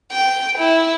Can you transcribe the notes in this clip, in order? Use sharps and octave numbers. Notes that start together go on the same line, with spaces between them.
G5
E4